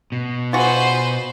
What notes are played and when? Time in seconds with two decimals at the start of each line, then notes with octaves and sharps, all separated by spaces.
0.12 B2
0.53 F4 F#4 G#4 B4 C5